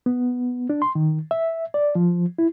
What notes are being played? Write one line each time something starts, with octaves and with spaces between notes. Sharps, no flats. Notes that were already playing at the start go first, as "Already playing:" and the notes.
B3
D4
C6
D#3
E5
D5
F3
E4